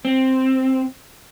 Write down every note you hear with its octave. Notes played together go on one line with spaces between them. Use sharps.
C4